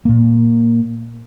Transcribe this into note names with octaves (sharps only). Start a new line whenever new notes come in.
A#2 A#3